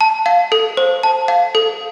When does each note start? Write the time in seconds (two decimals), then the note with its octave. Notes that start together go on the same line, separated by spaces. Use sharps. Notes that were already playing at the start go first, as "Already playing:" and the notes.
0.01 A5
0.26 F5
0.52 A4
0.77 C5
1.03 A5
1.28 F5
1.55 A4